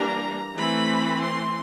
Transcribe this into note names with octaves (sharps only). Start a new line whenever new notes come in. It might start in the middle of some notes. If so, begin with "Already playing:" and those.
Already playing: E3 G3 A#3 D4 A#5
E3 A3 C4 B5
C6